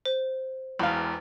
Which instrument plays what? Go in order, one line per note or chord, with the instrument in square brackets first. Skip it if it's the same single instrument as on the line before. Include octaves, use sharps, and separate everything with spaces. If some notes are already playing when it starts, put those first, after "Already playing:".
[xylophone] C5
[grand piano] E1 E2 [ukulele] F5 B5